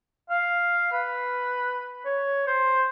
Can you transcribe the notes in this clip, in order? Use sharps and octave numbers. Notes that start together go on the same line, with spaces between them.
F5
B4
C#5
C5